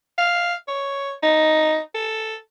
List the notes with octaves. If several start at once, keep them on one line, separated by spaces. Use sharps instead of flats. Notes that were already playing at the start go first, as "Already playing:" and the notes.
F5
C#5
D#4
A4